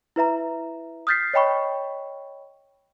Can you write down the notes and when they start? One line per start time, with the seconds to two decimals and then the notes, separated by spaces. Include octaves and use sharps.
0.16 E4 B4 E5 A#5
1.07 D#6 F6 G6 A6 B6 C7
1.34 C#5 D#5 G5 B5 C#6